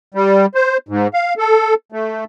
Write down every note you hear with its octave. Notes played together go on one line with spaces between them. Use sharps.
G3
C5
G#2
F5
A4
A3